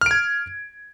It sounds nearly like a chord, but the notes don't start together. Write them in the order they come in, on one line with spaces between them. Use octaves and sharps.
F6 D7 G#6